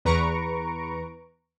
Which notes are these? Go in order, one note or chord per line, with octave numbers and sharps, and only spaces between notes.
E2 B4 A#5 C#6 D7